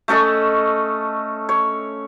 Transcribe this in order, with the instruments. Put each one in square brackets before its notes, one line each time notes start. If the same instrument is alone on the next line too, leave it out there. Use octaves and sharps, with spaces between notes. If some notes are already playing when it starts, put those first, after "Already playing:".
[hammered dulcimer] A3 C#4 A4 D#5
C#5